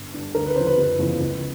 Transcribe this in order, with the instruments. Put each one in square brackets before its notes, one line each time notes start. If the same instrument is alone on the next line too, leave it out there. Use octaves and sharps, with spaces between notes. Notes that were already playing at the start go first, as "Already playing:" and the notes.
Already playing: [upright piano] G1
G2 D3
D2 A#4
B4
C#3 F3 C5
B4
F#1
E2 C#3 F3
C#2